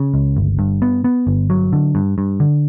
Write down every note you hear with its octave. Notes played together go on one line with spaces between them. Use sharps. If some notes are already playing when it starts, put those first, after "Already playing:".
Already playing: C#3
C#2
G1
G2
B3
B3
G1
F#3
D3
G2
G2
D3